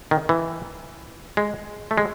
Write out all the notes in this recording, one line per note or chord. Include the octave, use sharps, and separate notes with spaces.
D#3
E3
G#3
A3
G#3